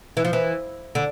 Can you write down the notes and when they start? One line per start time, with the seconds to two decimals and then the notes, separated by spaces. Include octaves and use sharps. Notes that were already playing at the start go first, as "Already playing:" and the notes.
0.17 E3
0.25 F3
0.33 E3
0.95 D3